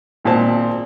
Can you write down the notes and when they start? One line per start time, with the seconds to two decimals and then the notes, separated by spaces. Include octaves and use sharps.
0.25 G#1 A#2 C4 A5